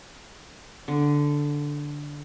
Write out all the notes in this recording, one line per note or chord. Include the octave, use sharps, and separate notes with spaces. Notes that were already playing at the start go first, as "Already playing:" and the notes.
D3